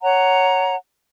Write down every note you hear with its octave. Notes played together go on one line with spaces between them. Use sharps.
C#5 F#5 A#5